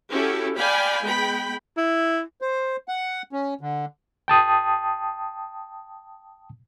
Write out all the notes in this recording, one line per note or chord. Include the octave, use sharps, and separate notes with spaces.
C#4 E4 F#4 G4 A4
D5 F5 G5 G#5 B5
G#3 B3 G5 B5
E4
C5
F#5
C#4
D3
G5 A5 D#6